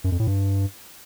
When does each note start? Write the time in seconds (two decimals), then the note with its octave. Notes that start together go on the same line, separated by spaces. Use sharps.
0.04 F#2
0.12 F2
0.20 A2
0.27 G2